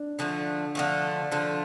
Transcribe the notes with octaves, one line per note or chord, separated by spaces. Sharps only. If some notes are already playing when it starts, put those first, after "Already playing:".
Already playing: D4
D3 F3 A3
D3 F3 A3
D3 F3 A3 D4